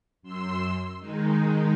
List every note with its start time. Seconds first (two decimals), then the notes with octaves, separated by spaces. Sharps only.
0.22 F#2 C6 E6
0.99 D#3 G#3 D#4